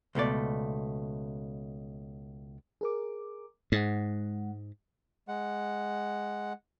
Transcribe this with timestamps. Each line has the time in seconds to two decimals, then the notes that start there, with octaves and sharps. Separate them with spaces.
0.15 C#2 B2 A3 D5
2.81 G#4 A#4 D6
3.72 G#2 G#3 F#5
5.28 G#3 F#5